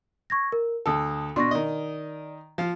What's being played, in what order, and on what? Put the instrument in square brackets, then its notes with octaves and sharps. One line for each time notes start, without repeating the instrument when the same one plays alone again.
[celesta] C#6 G#6 A#6
A#4
[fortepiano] D2 A4 [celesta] A5 D#6
[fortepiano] B2 D4 [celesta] C6 C#6 A#6
[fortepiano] D#3 D#5 [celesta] D5
[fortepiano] F3 F5